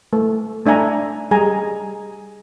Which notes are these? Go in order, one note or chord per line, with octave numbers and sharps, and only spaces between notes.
A3
A3 D4 E5 G#5 A#5
G3 G#4 G#5 A#5